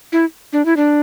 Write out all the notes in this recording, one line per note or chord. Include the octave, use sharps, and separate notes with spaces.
E4
D4
E4
D4